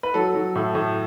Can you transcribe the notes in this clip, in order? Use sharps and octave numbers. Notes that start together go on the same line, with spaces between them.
B4
F#3 A4
F#3
A2
A2